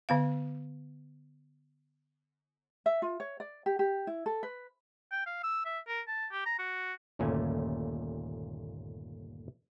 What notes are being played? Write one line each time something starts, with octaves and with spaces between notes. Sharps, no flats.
D3 B3 F5
E5
F4
C#5
D5
G4
G4
E4
A4
B4
G5
F5
E6
E5
A#4
A5
G4
A#5
F#4
G1 D#2 A#2 A3 C#4 G#5